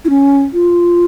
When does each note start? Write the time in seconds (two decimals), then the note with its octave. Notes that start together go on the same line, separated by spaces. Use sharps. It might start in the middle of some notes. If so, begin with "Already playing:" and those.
0.05 E4
0.10 C#4
0.53 F4